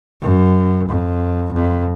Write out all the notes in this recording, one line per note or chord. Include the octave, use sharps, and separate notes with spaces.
F#2
F2
F2